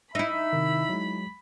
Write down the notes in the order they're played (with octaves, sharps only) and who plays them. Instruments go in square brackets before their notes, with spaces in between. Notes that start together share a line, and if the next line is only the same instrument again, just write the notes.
[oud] D#4 E4 [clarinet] E5 [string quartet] B5
[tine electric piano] C3 D#3
F#3 G#3